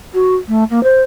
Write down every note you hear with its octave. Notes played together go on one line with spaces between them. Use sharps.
F#4
A3
A#3
C5